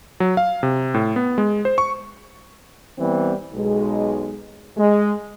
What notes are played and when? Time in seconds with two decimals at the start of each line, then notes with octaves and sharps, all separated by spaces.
0.20 F#3
0.37 F5
0.63 C3
0.94 A2
1.16 B3
1.38 G#3
1.65 C5
1.78 C#6
2.98 E3 G3 B3 C4
3.54 B1 G#3
4.77 G#3